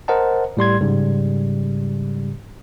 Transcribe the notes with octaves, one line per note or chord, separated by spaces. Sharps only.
A#4 C5 D#5 F#5 A5
A2 G3 C6 G#6
G#2 C#3 G3